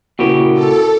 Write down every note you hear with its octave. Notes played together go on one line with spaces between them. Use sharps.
A#2 C#3 E4 F#4 G4 A#4
A4